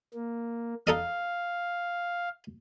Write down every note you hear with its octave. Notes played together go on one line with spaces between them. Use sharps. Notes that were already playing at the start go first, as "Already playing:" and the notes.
A#3
D#4 A4 D#5 F5